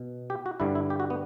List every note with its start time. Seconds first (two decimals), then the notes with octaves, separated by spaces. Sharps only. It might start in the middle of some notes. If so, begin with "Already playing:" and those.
Already playing: B2
0.30 G4
0.46 F#4
0.60 G2 D3 G3 E4
0.75 E4
0.90 G4
1.00 F#4
1.10 B3